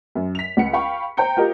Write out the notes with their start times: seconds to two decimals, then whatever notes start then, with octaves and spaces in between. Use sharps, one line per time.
0.15 F#2
0.35 B6 F7
0.57 C#2 F#5 C#7
0.73 F5 G5 B5 C#6
1.17 C5 G5 A#5 G6 C#7
1.37 F4 G4 A#4 D#5